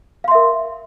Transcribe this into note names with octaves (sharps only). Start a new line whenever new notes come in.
A#4 E5 F5 C6